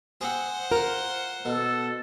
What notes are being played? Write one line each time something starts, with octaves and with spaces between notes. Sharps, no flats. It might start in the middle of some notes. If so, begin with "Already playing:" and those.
C4 G#4 C5 F#5
F4 A#4
B2 A4